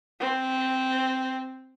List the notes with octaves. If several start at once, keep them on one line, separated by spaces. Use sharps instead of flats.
C4